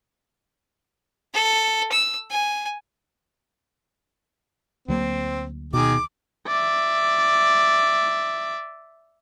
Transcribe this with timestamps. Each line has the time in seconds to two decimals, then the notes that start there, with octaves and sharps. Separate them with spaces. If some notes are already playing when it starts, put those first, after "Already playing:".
1.34 A4
1.92 E6
2.31 G#5
4.88 D2 F#3 A#3 C4
5.74 B2 D#3 G#4 D6
6.47 D5 E5